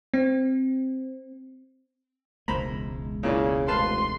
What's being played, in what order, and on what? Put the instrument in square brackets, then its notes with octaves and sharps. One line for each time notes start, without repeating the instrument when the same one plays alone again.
[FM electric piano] C4
[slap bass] E1 C#2 G#3 [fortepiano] C5 A#5 B5
[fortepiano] A#2 E3 D4 [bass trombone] C#3
[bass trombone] F1 [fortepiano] B4 F5 A5 [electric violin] C6